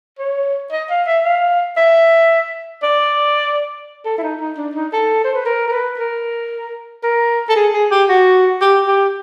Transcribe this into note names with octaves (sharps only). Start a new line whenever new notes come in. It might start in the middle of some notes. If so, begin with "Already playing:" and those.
C#5
D#5
F5
E5
F5
E5
D5
A4
E4
D#4
D#4
D4
D#4
A4
C5
B4
A#4
A#4
B4
A#4
A#4
A4
G#4
G#4
G4
F#4
G4
G4